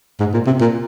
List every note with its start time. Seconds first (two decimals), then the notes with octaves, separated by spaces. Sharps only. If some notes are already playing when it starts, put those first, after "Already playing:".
0.20 G#2
0.33 A#2
0.47 C3
0.60 A#2